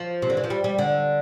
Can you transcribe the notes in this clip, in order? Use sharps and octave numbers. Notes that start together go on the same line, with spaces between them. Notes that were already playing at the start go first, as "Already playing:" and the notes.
Already playing: F3
C3
D3
E3
F3
G3
G3
D3